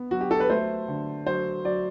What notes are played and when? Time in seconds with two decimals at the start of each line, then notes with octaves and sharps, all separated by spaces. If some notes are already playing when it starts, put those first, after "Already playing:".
Already playing: B3
0.11 F#3 F#4
0.21 G4
0.31 A4
0.40 B4
0.50 A3 C5
0.88 D3
1.26 F#3 C5
1.65 F#3 D5